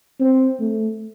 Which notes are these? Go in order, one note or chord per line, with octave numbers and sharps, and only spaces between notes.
C4
A3